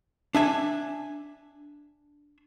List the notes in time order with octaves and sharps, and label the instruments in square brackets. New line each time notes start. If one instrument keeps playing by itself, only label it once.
[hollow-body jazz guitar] D4 E5 G#5